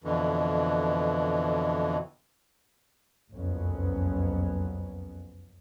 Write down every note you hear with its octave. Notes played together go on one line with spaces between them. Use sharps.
F2 B2 D3 E3
F#1 C2 F2 F#3 B3 C#4